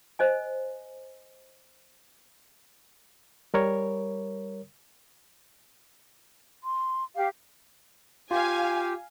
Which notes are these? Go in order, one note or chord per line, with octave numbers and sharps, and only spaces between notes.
C5 D#5 G#5
G3 A#4 C#5
C6
G4 F5
F4 G4 F5 G#5